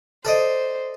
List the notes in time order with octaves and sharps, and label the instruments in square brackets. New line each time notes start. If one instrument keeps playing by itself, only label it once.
[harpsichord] A4 D5 D#5 [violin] C5